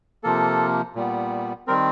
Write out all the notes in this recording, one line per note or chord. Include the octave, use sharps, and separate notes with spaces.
C3 F3 A#3 A4
A#2 G3 B3
D#3 G3 C4 A#4